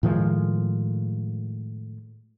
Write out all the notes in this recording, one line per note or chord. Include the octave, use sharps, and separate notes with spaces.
A2 D#3 F3 G#3